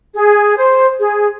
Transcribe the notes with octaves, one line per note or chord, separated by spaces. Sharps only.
G#4
C5
G#4